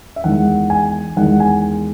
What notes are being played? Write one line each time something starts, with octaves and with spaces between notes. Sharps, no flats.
E5
E2 D#3 G#3 F#5
G#5
E2 D#3 G#3 F#5
G#5